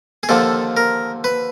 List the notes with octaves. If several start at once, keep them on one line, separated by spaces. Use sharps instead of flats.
G#4
D#2 D3 F3 A4
A#4
B4